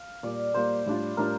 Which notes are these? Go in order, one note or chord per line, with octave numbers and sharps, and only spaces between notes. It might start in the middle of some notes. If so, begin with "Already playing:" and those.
Already playing: F5
A#2 G3 A#3 D5
A#2 G3 A#3 C5
A2 G3 D4 F4
A2 G3 D4 F4 A#4